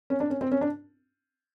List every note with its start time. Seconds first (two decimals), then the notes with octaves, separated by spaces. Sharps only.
0.10 C#4
0.20 D4
0.30 C#4
0.41 C4
0.52 C#4
0.61 D4